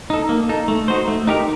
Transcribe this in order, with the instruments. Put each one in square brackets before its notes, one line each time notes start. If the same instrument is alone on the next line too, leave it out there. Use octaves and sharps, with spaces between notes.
[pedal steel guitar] D#4 A4
A#3
D#4 A4
A3
D#4 F#4 C5
A3
D#4 G4 A#4